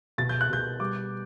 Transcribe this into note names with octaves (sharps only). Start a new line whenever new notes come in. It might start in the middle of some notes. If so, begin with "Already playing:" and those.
B2 A6
G6
F#6
B2 G6
G3 D6